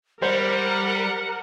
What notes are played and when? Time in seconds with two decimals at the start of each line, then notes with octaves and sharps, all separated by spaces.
0.22 G3 A#4 C5 F#5